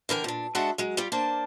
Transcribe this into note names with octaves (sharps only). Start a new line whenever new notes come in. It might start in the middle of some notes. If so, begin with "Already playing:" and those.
D3 E3 A#4 G5
A#2 D4
G#3 D4 F#4 A4 E5 F#5
F#3 G#3
G3 F4 G4
A#3 D4 C5 A5